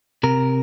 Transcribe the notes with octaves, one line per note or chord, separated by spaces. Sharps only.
C3 A#4